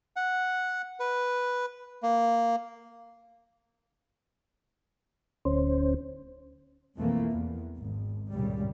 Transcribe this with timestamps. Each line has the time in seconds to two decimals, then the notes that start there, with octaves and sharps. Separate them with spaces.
0.16 F#5
1.00 B4
2.03 A#3
5.45 D1 C#4 C5
6.96 B1 F2 E3 A3 A#3
7.31 E2
7.77 G#1
8.32 G#1 C#2 G2 A#2 C#3 G3